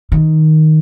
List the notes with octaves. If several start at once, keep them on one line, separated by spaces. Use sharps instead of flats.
D#3